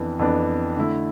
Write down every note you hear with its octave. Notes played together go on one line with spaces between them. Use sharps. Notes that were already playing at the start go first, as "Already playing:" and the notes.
Already playing: F2 E3 B3 D4
F2 E3 B3 D4
D3 A3 E4